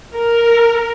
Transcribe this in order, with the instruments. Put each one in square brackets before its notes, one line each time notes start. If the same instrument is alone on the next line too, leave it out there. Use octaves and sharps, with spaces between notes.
[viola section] A#4